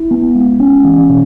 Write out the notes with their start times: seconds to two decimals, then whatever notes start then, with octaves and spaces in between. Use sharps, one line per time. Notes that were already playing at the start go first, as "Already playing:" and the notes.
Already playing: E4
0.11 B3
0.35 G#3
0.60 C#4
0.84 E3
1.09 B2